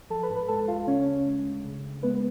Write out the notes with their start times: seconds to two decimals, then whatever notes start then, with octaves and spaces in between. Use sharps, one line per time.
0.10 F3 A4 A5
0.23 B4 B5
0.29 G#2
0.36 B4 B5
0.48 G#3 A4 A5
0.68 D2 F4 F5
0.87 C#3 C#4 C#5
1.06 D2
1.25 G#3
1.44 D2
1.64 C#3
1.84 D2
2.03 G#3 B3 B4